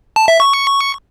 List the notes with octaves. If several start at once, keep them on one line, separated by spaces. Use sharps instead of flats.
A5
E5
C#6